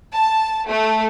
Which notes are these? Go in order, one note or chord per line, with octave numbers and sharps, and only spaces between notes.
A5
A3